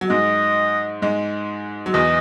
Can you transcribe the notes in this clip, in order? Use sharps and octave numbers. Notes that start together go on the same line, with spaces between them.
F#3
G#2 G#3 D#5
G#2 G#3
F#3
E2 E3 D#5